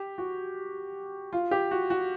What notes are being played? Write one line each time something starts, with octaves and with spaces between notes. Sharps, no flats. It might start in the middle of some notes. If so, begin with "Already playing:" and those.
Already playing: G4
F#4
F4
G4
F#4
F#4